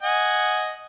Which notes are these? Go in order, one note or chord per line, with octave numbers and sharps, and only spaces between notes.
D#5 F#5 G#5